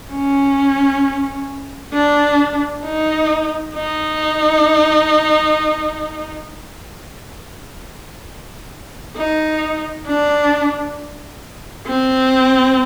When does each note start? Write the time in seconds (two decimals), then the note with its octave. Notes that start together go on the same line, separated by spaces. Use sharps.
0.13 C#4
1.93 D4
2.84 D#4
3.75 D#4
9.17 D#4
10.07 D4
11.88 C4